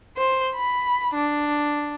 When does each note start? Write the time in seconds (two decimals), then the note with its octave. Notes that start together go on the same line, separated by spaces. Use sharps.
0.17 C5
0.56 B5
1.14 D4